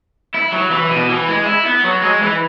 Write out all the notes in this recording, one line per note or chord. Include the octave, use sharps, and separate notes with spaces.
E4
F#3
E3
B2
E3
G#3
E4
B3
F#3
G#3
E3